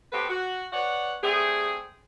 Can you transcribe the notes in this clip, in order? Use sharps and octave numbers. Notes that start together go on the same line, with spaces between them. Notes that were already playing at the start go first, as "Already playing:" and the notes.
B3 C4 F#4 G4 A4 B4
F#4
B4 C#5 D5 F#5
G3 A3 C4 G#4